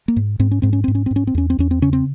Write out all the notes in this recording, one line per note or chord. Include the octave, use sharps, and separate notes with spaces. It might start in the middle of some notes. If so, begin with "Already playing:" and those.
A#3
G#2
G#2 C4
C#4
G#2 C4
C#4
G#2 C4
C#4
C4
G#2
C#4
C4
E2 C#4
C4
E2 C#4
C4
C#3 C#4
C4